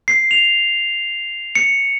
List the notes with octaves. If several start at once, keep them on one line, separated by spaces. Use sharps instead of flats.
C7
F7
C#7